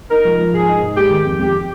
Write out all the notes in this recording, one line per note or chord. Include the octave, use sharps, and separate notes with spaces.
D#4 A#4
F3
F3
G#2 G#4
D#4
G#2
G#3 G4
D#3
F2
F2 G4